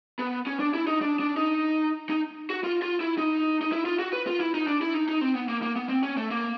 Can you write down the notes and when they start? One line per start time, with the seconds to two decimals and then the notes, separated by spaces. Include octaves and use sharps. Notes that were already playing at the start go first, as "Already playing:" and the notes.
0.19 B3
0.47 C#4
0.60 D4
0.74 E4
0.87 D#4
1.02 D4
1.20 D4
1.37 D#4
2.10 D#4
2.50 F#4
2.64 F4
2.82 F4
3.00 E4
3.18 D#4
3.62 D#4
3.72 E4
3.86 F4
3.99 F#4
4.13 B4
4.27 F4
4.40 E4
4.55 D#4
4.68 D4
4.81 E4
4.94 D#4
5.09 D#4
5.21 C4
5.35 B3
5.49 A#3
5.62 A#3
5.76 B3
5.89 C4
6.03 C#4
6.17 A3
6.31 A#3